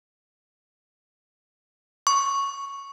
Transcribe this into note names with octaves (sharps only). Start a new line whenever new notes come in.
C#6